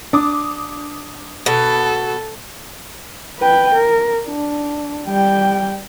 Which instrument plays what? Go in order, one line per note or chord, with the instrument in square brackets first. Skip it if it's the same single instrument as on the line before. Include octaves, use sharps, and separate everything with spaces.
[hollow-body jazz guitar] D4 [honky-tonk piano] D6 D#6
[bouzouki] B2 [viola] A4
[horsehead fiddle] B4 G5
A#4
D4
G3 G5